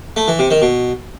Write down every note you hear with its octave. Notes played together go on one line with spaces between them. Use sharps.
A3
E3
C3
D#3
B2